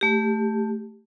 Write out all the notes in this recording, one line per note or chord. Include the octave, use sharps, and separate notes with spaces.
A3 G4